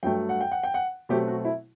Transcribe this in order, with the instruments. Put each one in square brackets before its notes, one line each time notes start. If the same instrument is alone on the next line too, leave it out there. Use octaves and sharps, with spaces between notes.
[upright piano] G2 F#3 A3 G5
F#5
G5
F#5
G5
F#5
B2 F#3 A3 C4 G4
F#4
E4